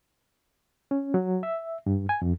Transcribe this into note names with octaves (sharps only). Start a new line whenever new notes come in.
C#4
F#3
E5
G2
G#5
F2